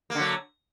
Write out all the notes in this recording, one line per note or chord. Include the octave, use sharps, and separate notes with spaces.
D3 F#3 A#3